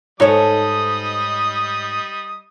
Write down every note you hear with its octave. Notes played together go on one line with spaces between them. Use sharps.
G#2 G3 D#4 A4 C#5 D#5 D#6